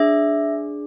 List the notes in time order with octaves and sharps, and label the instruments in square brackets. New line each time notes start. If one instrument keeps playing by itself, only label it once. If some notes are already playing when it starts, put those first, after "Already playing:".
Already playing: [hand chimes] D4 G#4 E5